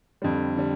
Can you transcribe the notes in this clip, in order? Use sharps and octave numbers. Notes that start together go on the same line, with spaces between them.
F2 D3 G3
D3 G3